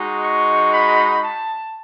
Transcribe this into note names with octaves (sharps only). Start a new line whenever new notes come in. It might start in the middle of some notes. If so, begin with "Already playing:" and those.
Already playing: G#3 D#4 F#4
C#6
B5
A5